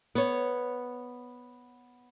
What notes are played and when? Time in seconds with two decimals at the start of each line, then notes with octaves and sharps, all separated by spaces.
0.15 B3 C#5